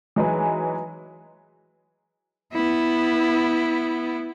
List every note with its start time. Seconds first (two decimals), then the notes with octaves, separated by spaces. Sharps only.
0.16 E3 F#3 G#3 D#4 G#4 B4
2.53 B3 E4